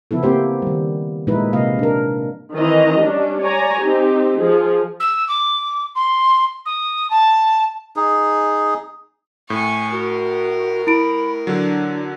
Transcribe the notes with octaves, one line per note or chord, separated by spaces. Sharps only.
C#3 F3 B3 E4 A4
A#3 C4 G4 C5
D#3 G3
A#2 F3 G#3 D#4 E4 B4
C3 A#3 D#5 F5
D4 A#4
D#3 E3 C4 D#5 A#5
G3 C#4 D4
C#5 D5 G#5 A#5
C4 D#4 G4
F3 G#4
E6
D6
C6
D#6
A5
D#4 G#4
A2 G#5 C#6
F#4 A#4
E4 B5 D7
D3 F#3 D4